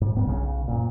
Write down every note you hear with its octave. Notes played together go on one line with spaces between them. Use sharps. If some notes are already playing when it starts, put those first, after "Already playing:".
G#2
D#1 G2 B3
B1 C#3
F#1 A#2